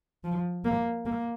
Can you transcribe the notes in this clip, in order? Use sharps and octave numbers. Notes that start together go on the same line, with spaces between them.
F3
A#3
A#3